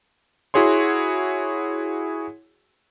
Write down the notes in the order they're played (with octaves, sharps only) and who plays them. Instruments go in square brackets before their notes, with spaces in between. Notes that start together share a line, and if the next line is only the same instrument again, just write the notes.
[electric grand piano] E4 F#4 G#4 C#5 C6